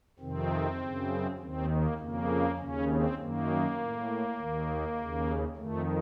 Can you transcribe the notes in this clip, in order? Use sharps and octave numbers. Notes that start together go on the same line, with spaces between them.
F2 C3 D#3 C4
F#2 C#3
D#2 D#3 C4
A#3
F2 C#3 A#3
D#2 C#3 C#4
C4
F#2 D#3 A#3
A2
D#2 D#3
D#2 C#3
F2 D#3 A3